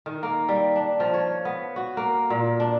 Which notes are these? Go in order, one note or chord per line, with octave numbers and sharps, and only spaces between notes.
D#3
A#3
G3
D4
F3
C#5
B3
F#4
A#3
A#2
D4